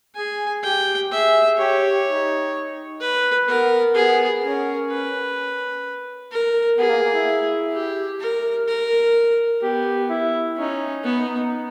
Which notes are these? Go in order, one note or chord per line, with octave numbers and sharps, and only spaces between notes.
G#4 G#5
G4 G5
G#4 E5
G4 C#5
D#4
B4
B3 A#4
B3 G#4
C#4 A#4
B4
A#4
B3 G#4
A#3
A#3
E4
G4
A#4
A#4
B3 G4
E4
C#4 D#4
B3